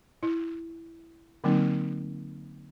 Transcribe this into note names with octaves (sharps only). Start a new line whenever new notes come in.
E4
D3 F#3 A#3 C4 D#4